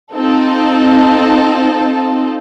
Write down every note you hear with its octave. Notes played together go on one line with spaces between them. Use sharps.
C4 D#4 F4 A4